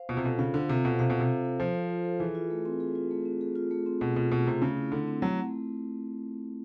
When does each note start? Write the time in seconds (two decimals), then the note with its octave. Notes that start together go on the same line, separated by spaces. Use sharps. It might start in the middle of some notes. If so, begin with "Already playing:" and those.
Already playing: C5 F5
0.09 B2 F4
0.17 C3
0.24 B2 A4
0.39 C#3 F5
0.54 D3 C5
0.69 C3 F4
0.84 B2 A4
0.99 C3 F5
1.10 B2 C5
1.20 C3
1.29 F4
1.45 A4
1.60 F3 F5
1.75 C5
1.90 F4
2.05 A4
2.20 E3 G#4
2.35 F4
2.50 A3
2.65 C4
2.80 G#4
2.95 F4
3.11 A3
3.25 C4
3.41 G#4
3.56 F4
3.71 A3
3.86 C4
4.01 B2 G#4
4.16 B2 F4
4.32 B2 A3
4.47 C3 C4
4.61 C#3 A3
4.77 E4
4.92 D3 A3
5.07 C4
5.22 F#3 A3